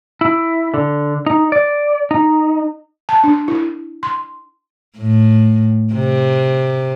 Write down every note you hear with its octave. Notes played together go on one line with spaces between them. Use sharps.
E4
D3
D#4
D5
D#4
A5
D4
E4
C6
A2
C3